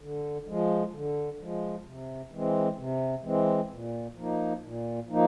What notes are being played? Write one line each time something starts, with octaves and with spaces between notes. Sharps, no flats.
D3
F3 G#3
D3
F3 G#3
C3
E3 G#3 C4
C3
E3 G#3 C4
A#2
F3 A#3 D#4
A#2
F3 A#3 D#4